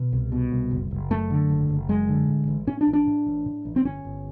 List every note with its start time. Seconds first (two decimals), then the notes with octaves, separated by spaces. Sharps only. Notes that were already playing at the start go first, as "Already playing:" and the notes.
Already playing: B2
0.12 C2
0.32 B2
0.52 C2
0.71 F#1
0.91 F#1
1.10 F#2 A3
1.30 D3
1.50 F#1
1.69 F#1
1.89 F#2 G#3
2.09 D3
2.29 A2
2.47 A1
2.67 A2 C#4
2.81 D4
2.87 A1
2.93 D4
3.07 A2
3.26 A1
3.46 A2
3.65 A1
3.76 C4
3.85 G1 C#4
4.05 G1